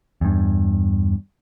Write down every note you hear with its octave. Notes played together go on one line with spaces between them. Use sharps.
E2 G2